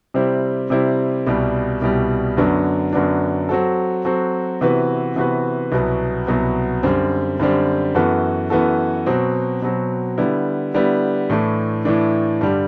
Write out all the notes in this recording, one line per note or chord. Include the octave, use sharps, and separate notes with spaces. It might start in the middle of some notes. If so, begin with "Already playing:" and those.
C3 G3 C4 E4
C3 G3 C4 E4
C2 B2 G3
C2 B2 G3
F#2 D3 F#3 B3 D4
F#2 D3 F#3 B3 D4
F#3 C4 F#4 A4
F#3 C4 F#4 A4
C3 E3 B3 F#4 B4
C3 E3 B3 F#4 B4
C2 B2 F#3 B3
C2 B2 F#3 B3
F#2 D3 G3 C4
F#2 D3 G3 C4
F#2 E3 B3 F#4 A4
F#2 E3 B3 F#4 A4
B2 F#3 C4
B2 F#3 C4
D3 G3 B3 E4
D3 G3 B3 E4
A2 E3 A3 D4
A2 E3 A3 D4
G2 D3 G3